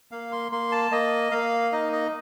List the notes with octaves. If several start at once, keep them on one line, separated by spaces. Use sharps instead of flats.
A#3 F5
C6
A#3 C6
A5
A#3 D#5
A#3 F5
D#4 D#5
D#5